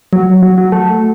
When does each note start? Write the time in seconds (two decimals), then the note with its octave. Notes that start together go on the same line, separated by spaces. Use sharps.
0.13 F#3
0.43 F#3
0.58 F#3
0.72 A3